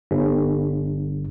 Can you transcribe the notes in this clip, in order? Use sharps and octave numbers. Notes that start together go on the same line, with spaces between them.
G1